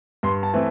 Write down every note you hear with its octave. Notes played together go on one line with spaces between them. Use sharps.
G2 C6
A5
E3 A3 C4